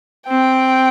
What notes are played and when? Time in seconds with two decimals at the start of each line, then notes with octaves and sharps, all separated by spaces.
0.28 C4 G5